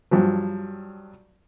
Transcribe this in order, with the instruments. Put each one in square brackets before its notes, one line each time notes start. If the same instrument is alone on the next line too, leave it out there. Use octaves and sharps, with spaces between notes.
[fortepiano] G2 F3 F#3